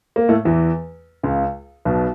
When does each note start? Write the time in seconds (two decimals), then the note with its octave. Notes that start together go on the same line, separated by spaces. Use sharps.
0.16 A#3
0.29 A2 A3
0.45 E2 E3
1.23 C#2 C#3
1.85 B1 B2